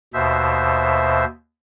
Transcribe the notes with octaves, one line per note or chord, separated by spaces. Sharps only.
D#2 B2 C5 E5